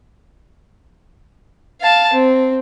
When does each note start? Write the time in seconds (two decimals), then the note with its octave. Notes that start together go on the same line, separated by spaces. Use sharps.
1.81 F5 A5
2.14 C4